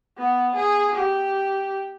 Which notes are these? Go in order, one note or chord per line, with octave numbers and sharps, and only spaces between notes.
B3
G#4
G4